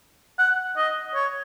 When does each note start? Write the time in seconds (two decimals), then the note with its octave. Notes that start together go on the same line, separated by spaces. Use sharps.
0.39 F#5
0.77 D#5
1.15 C#5